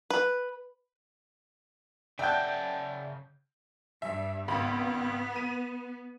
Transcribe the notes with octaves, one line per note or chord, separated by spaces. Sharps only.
B4
C#3 D5 E5 F#5 G5 A5 G6
G2 E5
G#1 C#2 B3 B5
D#7